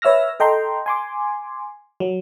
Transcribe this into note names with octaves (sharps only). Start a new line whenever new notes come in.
B4 C#5 E5 E6 F6 A#6
A4 D#5 G5 A#5 C6
G#5 C6 D6
F#3